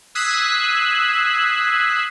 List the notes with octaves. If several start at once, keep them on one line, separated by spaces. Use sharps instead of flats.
D#6 E6 F#6 G#6 B6 C7